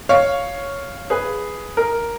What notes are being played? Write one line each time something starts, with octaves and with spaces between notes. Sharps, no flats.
C#5 F5
G#4 B4
A#4